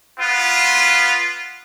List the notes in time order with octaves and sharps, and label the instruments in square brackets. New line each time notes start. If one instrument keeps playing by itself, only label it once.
[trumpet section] B3 F4